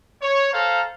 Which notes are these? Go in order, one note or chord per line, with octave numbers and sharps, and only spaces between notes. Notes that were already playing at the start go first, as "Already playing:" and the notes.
C#5
A4 C5 F5 A#5